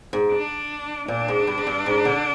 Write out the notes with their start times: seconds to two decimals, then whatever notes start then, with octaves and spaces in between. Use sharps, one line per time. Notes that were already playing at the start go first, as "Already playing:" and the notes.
0.13 G#2
0.32 D4
1.08 A#2 D4
1.28 G#2
1.47 G2
1.58 G#2
1.67 G2
1.86 G#2
2.05 D3